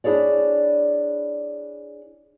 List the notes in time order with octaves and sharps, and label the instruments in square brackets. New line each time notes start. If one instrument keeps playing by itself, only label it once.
[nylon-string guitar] D4 E4 G#4 C#5 D5